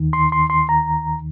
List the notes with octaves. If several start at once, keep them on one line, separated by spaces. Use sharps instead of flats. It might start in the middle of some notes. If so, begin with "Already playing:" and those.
Already playing: D#2 D#3
C6
C6
C6
A#5